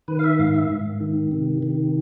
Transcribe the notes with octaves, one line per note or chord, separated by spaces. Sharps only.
D#3 B4
F5
E5
G#2 F5
E5
G#2
D#3
C3
D#3